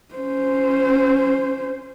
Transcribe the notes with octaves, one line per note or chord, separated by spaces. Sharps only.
C#4 C5